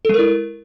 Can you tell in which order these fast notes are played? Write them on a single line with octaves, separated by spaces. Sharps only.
A4 G#3 A#4 E4